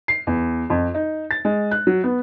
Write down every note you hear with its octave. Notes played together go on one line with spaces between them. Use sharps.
C7
E2
F2
D#4
A6
G#3
F#6
F#3
B3